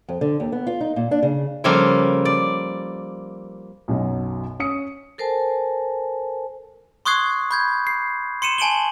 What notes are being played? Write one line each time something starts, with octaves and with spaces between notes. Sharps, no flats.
F2
D3
D#2
B3
F4
D#4
A#2
D4
C#3
C#3 F3 G3 A#3 A4 F5
D5
B1 F#2 B2 F#3
C#4 D#6 C#7
A4 A#4 C5 G#5 A5
C6 C#6 D#6 F#6 G#6 C7
B5 G6 G#6
C7
C6 C#7 D#7 E7
G#5 A5 D7 E7 F#7 G7